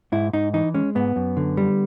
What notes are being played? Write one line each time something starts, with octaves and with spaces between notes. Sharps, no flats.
G#2 E4
G#2 D#4
E3 D#4
G#3 C#4
G#2 B3
F#2
D3
G3